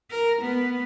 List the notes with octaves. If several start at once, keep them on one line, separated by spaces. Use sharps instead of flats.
A#4
B3